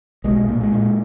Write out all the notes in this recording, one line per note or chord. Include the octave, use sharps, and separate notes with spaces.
B1 G#3
G#3
A#2 A#3
G#3
A#2 G#3